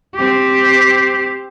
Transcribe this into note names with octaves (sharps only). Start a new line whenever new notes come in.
C4 G4